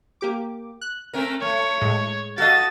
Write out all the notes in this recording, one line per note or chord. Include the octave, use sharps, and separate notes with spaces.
A#3 G4 D6
F#6
A3 C4 A#4
A3 C#5
A2 G#3
F#4 A4 D#5 F5 A6